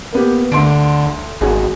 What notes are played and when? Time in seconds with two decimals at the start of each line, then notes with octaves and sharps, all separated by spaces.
0.13 A#3 B3 G4
0.52 D2 D3 C6 D7
1.41 G#1 F#4 G#4